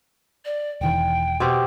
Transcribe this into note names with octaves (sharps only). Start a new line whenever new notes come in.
D5
E1 D#3 E3 G5
B2 C4 G4